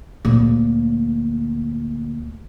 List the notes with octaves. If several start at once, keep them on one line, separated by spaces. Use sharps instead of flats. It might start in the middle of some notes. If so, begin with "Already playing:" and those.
D2 A#2